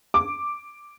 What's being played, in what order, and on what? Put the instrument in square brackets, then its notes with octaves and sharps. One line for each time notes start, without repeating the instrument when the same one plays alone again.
[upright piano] D6